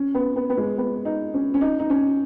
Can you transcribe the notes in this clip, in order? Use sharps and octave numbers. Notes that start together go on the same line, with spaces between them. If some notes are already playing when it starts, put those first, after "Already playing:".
Already playing: C#4
B3
B3
B3
G#3
B3
D#4
C#4
C#4
D#4
D#4
C#4